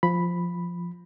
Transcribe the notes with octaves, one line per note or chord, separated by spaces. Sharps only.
F3 B5